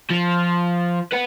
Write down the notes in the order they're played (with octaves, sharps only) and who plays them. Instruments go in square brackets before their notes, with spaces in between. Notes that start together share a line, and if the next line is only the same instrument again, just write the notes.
[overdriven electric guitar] F3
B4 F#5